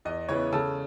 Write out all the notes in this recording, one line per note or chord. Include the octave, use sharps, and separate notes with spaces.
E2 D#5
C#3 E3 B3 C#5
C#3 A4